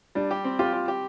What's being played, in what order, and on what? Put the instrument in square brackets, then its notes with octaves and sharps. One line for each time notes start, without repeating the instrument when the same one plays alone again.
[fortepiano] G3 [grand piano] D4
[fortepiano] G4
C4
[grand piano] F4 [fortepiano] G4
[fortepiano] G4
G4